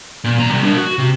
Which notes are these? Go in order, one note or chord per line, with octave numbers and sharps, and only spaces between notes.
A#2
D#2 A#5
C3 G3
D4 A#4
F#4
C3